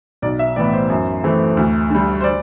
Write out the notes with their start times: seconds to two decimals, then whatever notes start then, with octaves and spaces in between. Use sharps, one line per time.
0.22 B1 D5
0.39 E5
0.56 A2 E3 B3 D5
0.73 C5
0.90 F#2
1.24 E3 A3 C4
1.57 D2
1.90 D3 G3
2.21 C5
2.24 D5